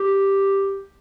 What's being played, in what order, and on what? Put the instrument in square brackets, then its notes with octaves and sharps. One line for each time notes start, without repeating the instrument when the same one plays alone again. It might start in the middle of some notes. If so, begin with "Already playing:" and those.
Already playing: [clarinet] G4